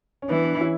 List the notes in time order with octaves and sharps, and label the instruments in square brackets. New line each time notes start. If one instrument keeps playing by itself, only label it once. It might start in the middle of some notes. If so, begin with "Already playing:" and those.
[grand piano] C#4
[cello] E3 [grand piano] B3 D4
[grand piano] B3 D4
C#4 E4